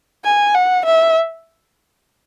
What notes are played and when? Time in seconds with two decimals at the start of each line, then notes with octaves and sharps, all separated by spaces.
0.24 G#5
0.54 F#5
0.85 E5